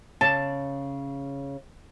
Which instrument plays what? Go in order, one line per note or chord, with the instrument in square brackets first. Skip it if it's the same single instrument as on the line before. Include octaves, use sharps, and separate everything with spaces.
[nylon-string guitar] C#3 [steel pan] A5